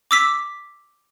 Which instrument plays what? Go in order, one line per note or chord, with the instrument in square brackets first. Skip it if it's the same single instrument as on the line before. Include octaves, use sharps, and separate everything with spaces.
[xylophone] D6 E6 B6